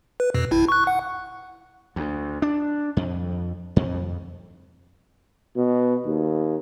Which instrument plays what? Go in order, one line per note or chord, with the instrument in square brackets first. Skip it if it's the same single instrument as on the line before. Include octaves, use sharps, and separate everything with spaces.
[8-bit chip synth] B4
F2 B2
G#1 E4
C#6 F#6
F#5
[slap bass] D2
D4
F2
F2
[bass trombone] B2
D#2